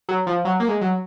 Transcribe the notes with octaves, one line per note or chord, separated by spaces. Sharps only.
F#3
F3
F#3
A#3
G#3
F#3